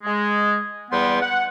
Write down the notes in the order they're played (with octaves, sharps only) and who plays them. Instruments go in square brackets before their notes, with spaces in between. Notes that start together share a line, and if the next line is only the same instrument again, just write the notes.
[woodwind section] G#3
E2 G3 B3 G5 C6
F#5